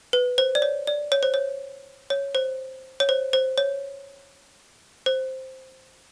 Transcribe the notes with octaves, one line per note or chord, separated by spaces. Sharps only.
B4
C5
D5
C#5
D5
C#5
C5
C#5
C#5
C5
C#5
C5
C5
C#5
C5